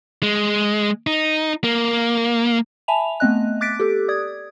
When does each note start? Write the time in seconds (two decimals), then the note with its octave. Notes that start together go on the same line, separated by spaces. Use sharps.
0.23 G#3
1.07 D#4
1.64 A#3
2.88 E5 G#5 A5 B5 F7
3.20 A3 B3 C4 D#5 F#6
3.61 D6 F#6 A6 B6 D7
3.80 G4 A4
4.08 D5 D#6 G#6